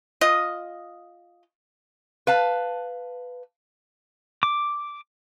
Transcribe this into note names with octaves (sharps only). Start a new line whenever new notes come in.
F4 D#5
B4 F5 A5
D6